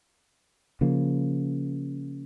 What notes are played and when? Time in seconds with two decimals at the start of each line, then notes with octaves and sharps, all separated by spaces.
0.81 C#3 F3 A#3